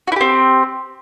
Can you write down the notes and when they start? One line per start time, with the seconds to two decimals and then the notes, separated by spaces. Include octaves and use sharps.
0.07 F#4
0.12 E4
0.16 G4
0.21 C4